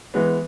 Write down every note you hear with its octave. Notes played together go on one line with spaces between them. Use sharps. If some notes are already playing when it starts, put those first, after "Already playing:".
E3 G#3 B3